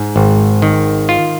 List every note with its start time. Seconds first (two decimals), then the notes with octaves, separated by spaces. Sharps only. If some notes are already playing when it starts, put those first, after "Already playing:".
Already playing: G#2
0.16 G#1
0.62 D#3
1.09 F4